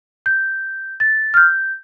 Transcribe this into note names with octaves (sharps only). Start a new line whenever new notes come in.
G6
A6
F6
G6